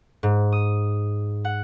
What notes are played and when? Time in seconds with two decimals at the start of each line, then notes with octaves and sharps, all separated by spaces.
0.23 G#2
0.52 D#6
1.45 F#5